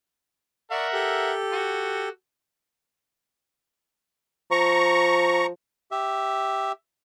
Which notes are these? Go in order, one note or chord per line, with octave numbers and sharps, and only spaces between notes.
A#4 D5 E5 F#5 C#6
G4 A4
F#4
F3 A#5 C#6
G4 E5